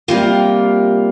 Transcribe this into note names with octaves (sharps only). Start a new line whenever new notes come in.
C3 G3 A#3 F4